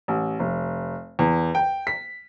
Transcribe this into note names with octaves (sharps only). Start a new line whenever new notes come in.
A1
F1
E2
G5
B6